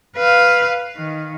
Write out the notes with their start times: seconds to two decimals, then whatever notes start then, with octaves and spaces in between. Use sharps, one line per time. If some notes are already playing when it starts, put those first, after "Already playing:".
0.17 B4 F5
0.97 D#3